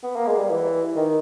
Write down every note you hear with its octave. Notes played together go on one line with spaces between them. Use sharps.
B3
A#3
G#3
G3
E3
D#3